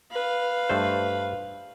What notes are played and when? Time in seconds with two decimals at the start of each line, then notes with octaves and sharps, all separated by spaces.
0.11 B4 F5
0.69 G2 A3 C5